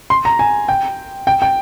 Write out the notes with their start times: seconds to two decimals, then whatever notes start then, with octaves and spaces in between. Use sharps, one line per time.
0.10 C6
0.25 A#5
0.39 G#5
0.69 G5
1.27 G5
1.42 G5